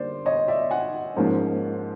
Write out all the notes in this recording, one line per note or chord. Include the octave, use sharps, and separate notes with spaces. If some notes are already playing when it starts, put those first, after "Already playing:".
Already playing: D3 G3 A#3 C5 D5
C#5 D#5
D5 E5
F#5 G#5
G#2 F3 A#3 C#4